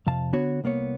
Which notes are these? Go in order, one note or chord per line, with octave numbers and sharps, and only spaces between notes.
F2 C3 F5 A5
D3 B3 F#4 C#5
C2 A#3 B3 C#5